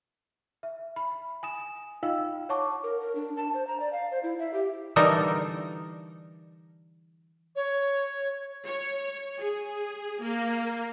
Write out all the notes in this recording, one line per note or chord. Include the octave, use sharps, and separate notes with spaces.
E5
B5
G#5 D#6 E7
D#4 F4 D#5 F5 G5 E6
C#5 F#5 A5 C#6 D6
A#4
A#4
D4
A5
C5
A#5
D5
F5
C5
E4
E5
G4
D3 E3 G3 D#4 A4 A#4
C#5
C#5
G#4
A#3